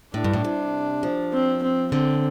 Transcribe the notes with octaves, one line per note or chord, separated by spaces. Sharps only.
A2 D4
G2
A2
C3
F3
C4
C4
D3 C4